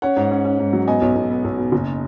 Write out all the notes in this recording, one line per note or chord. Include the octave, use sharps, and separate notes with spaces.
C#4 C#5 F#5
G#2
C#4
C#4
G#2
F#3
B3 D#5 G#5
B1
B1
B3
B1
B2
F#1